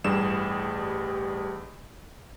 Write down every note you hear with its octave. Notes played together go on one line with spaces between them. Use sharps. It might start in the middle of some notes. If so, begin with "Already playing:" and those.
A1 G2 G3 G#4 E7